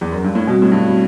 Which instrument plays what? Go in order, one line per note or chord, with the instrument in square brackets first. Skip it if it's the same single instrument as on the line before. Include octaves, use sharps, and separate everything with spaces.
[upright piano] E2
F#2
G2
A2
[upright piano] B2 [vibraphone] G3 C4 F#4
[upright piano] A2
G2